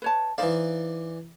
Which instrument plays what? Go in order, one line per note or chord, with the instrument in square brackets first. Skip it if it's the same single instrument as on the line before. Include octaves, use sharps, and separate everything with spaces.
[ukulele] B4 C#5 A5
[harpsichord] E3 D5 [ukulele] D#4 C5 F5